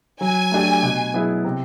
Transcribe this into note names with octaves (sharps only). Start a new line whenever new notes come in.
F#3 G#5
A3 D4 G4
B2
F#3 B3 E4 G#4
C3